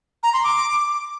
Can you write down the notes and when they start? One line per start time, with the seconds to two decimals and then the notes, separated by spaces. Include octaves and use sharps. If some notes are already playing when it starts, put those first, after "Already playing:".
0.23 A#5
0.33 C6
0.43 D6